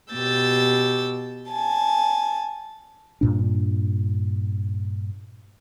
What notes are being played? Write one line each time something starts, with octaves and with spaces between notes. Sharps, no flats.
B2 G4 E6 G6 A6
G#5 A5
G2 A#2 D4